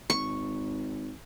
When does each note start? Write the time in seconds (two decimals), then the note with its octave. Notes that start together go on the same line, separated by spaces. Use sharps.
0.10 G#1 C#6